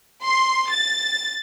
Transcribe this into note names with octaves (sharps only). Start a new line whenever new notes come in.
C6
A6